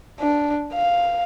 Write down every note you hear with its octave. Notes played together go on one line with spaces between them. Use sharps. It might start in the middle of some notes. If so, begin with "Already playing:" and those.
D4
F5